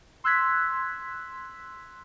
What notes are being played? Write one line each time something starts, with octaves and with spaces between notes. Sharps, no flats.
C6 E6 F#6 G#6 B6